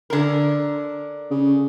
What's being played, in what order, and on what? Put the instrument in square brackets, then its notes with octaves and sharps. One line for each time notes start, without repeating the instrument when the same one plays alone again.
[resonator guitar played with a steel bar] D3 A#4
[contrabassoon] C#3